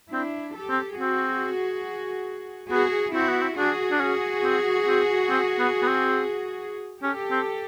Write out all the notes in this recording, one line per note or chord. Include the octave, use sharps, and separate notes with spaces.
C4 D4 E4
G4 A4
C4
C4 F#4 G#4
B3 F#4 G#4
C4 E4 F#4
B3
C4
D4 F#4 G#4
D4
C#4
C4
C4
C4
B3
B3
C4
C#4 G4 A4
C4